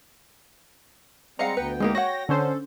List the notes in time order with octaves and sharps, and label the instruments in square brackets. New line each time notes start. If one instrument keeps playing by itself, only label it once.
[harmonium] G3 G#3 C4 [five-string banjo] D#5 F5 F#5 [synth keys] A#5 C#7
[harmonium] D2 B3 G5 [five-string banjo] B4
[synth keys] G#3 A#3 [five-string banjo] C4 D#4 G4
[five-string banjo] F#4 F#5 [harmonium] C#5 G5 [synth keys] A#6
[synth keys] D3 C#4 C5 [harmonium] A4